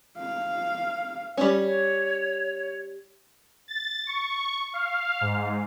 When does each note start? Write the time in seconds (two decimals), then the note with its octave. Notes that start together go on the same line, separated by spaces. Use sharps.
0.18 F5
1.37 G3 C#4
1.64 C#5
3.68 A6
4.07 C#6
4.73 F5
5.21 G#2